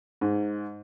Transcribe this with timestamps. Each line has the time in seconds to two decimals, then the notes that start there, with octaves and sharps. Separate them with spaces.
0.21 G#2